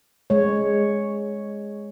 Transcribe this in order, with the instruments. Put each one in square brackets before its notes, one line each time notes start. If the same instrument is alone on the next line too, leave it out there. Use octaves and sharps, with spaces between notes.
[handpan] G#3 C#5